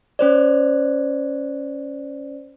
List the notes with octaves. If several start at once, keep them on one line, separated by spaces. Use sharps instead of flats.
C#4 C5 D5